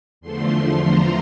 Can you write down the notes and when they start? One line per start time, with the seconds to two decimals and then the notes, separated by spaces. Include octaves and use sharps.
0.21 E2 D3 F3 A3 C6
0.85 A#5